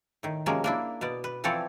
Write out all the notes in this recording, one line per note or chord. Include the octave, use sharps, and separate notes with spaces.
A2 D#3
C3 F3 F#3 G#3 A#3 C#4
A#3 D4 E4
B2 B3 D5
B4
E3 F3 C4 A4 C#5 D5